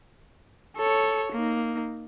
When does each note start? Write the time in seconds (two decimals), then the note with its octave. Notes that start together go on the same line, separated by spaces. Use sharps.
0.77 A4 C#5
1.32 A#3 D#4